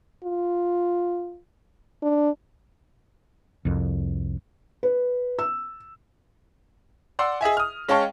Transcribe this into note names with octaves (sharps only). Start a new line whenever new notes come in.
F4
D4
C2 F2
B4
E6
D5 F#5 C6 E6
G#4 D#5 E5 G#5
D#6 F6
G#3 C#4 F5 G5 A5 C#6